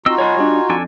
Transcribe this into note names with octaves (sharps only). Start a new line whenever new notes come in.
C4 D#4 F4 F#4 D#5 E6
C#5 D#5 G#5 B5
G3 D4
F2 D4 A4 G#5